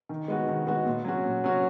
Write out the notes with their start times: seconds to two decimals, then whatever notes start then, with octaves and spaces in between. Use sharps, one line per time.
0.09 D#3
0.28 G#3 B3 F#4
0.48 D#3
0.67 G#3 B3 F#4
0.86 A#2
1.05 F#3 C#4 F#4
1.24 A#2
1.44 F#3 C#4 F#4